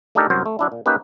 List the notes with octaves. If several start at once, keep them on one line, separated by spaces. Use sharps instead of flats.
A3 D4 D#4 G4 A4 A#4
C2 F#2 F#3 C5 C#5
A3
F#3 D4 E4
A#2
A#3 C#4 D#4 G4 B4